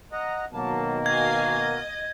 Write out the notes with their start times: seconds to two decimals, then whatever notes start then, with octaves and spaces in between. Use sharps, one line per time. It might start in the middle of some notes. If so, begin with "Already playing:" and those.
0.12 D#5 F#5 A#5
0.53 B2 D#3 F#3 A#3 A5
1.06 F#4 A#4 D#5 F5 G#5 G#6
1.54 D#5